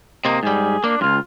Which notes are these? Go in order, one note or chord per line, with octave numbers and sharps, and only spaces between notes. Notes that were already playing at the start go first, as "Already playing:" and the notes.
C3 A#3 D#5
G#2 G3 G#4
A#3 D4
C#2 G2 F4